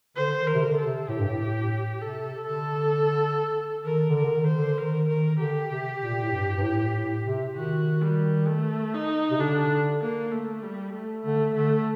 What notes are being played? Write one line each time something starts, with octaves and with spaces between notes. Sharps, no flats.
D3 C5
D#3
A#4
C3
D3
A4
C3
A2 G4
G2
A2
C3 A4
D3 A4
D#3 A#4
D3
A#4
D3
D#3
C5
D3
D#3 A#4
D#3 A#4
D3 G4
C3
A#2
A2
G2
G2
A2
A2
C3
D#3 F#4
G3
A3
D#4
C3
D3 D4
A#3
A3
G3
A3
D3 A3
D3 A3